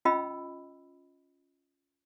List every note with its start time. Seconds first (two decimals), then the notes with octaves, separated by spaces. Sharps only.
0.05 C#4 F4 D#5 G5 B5 E6